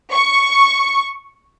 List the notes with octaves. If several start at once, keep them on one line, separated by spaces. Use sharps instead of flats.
C#6